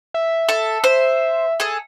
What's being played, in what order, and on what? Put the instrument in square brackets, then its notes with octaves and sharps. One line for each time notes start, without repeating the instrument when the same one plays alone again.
[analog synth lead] E5
[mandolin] A4
C5
G#4 A4